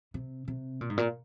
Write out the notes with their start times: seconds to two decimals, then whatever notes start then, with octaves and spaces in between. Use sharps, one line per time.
0.14 C3
0.48 C3
0.81 A#2
0.90 G#2
0.98 A#2